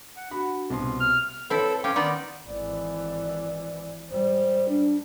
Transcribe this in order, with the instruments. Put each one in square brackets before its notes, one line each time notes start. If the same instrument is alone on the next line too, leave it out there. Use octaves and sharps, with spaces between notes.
[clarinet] F#5
[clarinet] D4 [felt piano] F#4 B5
[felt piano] C2 B2 C6
[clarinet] F6
[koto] C4 E4 [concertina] A4 [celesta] B4 C#5
[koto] C#4 [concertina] F5 G5 [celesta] C6 D6
[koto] D#3 B3 D#4 [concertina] D5
[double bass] G#1 E3 [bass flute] D5
[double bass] G#2 G3 [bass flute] C5
[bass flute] D4